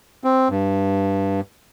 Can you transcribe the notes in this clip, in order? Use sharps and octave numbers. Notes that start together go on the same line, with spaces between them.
C4
G2